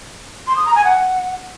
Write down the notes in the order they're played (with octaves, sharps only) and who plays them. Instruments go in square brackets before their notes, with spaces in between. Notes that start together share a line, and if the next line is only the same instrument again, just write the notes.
[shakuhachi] C6
D#6
A#5
G#5
F#5